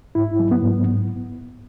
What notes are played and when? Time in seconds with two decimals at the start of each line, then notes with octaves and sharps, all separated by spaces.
0.15 G#2 E4
0.40 F#3
0.51 B3
0.62 G#2